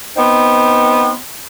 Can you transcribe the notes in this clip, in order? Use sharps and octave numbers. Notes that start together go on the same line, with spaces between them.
B3 C4 D#4